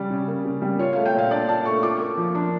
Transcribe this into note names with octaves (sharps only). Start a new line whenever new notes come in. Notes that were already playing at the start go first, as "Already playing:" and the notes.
Already playing: C#3 G3 D5
C#3
A#3
C#3
G3
F4 C#5
A3 F5
G5
A#2 F5
D4 D5
F4 A5
A3 C#6
F4 D6
A#3
F3
D4